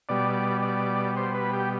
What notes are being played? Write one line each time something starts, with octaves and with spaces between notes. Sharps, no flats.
B2 G3 D5
D5
C5
B4
G4